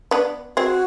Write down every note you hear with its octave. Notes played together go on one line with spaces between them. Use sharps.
B3 D4
C4 F#4 G#4